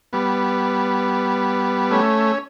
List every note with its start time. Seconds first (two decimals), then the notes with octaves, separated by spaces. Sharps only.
0.13 G3 B3
1.91 A3 C#4